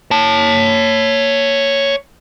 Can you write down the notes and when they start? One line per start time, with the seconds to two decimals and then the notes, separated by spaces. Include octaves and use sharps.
0.11 C#5 A5